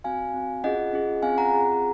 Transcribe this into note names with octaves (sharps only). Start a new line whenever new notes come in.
C4 F#4 F5 G#5
C4 F#4
C#4 F4 G#4 D#5 F#5
C#4 F4 G#4
C4 F4 G#4 F5 G#5
F#5 A#5
C4 F4 G#4